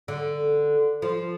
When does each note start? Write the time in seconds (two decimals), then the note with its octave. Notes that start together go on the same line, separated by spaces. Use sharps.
0.08 D3
1.02 F3